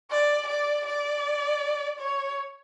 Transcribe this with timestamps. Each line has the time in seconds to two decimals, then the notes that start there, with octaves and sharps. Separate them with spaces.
0.11 D5
0.48 D5
0.86 D5
1.99 C#5